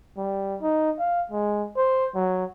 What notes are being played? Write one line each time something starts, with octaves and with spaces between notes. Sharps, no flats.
G3
D#4
F5
G#3
C5
F#3